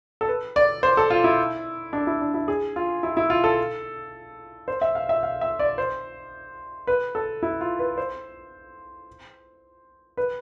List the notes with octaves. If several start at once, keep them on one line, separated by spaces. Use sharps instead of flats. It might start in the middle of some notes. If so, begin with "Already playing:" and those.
A4
B4
D5
C5
A4
F4
E4
D4
E4
D4
E4
G#4
F4
E4
E4
F4
A4
C5
E5
F5
E5
F5
E5
D5
C5
B4
A4
E4
F4
B4
C5
B4